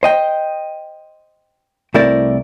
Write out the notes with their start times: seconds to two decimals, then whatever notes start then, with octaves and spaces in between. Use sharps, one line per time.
0.03 C5 D#5 G5
1.94 C2 A3 C4 E4 A#4 D5